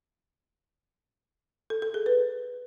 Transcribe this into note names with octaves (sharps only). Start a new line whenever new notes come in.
A4
A4
G#4
B4